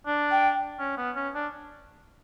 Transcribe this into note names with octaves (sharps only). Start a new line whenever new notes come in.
D4
G5
C#4
B3
C#4
D4